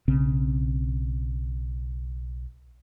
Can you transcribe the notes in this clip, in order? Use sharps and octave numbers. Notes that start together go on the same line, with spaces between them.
B1 C#3 C4